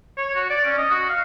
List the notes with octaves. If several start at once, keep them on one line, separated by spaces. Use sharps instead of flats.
C#5
F#4
D5
C#4
D#5
F#4
F5